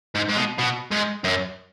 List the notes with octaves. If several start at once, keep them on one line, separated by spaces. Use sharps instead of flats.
G#2
G#2
B2
B2
G#2
F#2